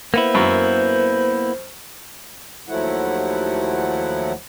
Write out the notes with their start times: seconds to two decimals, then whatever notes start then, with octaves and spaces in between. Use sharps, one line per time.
0.14 A#3 B3 E4 C5
0.34 F#2
2.69 D#2 F3 F#3 A3 E4 F#5